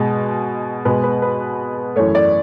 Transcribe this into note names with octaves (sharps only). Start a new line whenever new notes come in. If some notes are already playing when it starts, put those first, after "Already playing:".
Already playing: B2 G#3
B2 G#3 B4
B4
B4
F#2 E3 A3 C#5
D5